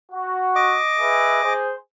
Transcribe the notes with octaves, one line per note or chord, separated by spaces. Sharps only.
F#4
D#5 D6
G#4 B4 E5
G#4 C5